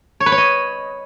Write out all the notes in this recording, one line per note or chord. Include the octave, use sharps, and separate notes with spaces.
C#5
B4
C#5
D#5